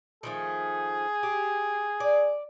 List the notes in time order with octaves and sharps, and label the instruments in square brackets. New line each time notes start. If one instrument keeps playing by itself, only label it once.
[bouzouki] D#3 F3 A3 [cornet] G#4
[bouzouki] G4
D5